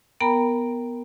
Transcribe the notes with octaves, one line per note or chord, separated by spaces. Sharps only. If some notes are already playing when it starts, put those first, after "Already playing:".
B3 A#4 G5 A#5 B5